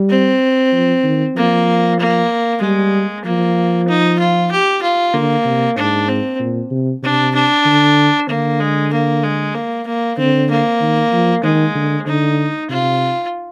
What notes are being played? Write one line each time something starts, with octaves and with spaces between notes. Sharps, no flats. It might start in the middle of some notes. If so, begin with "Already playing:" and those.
Already playing: G3
C4
F3
D#3
F3 A#3
A#3
G3 G#3
F3 A#3
D#4
F4
G4
F4
D3 A#3
C3
G#2 D4
C4
A#2
C3
C3 D4
D4
D3
D3 A#3
G#3
A#3
G#3
A#3
A#3
D3 C4
A#3
D#3
F3
D#3 G#3
D3
D3 D#4
C3 F4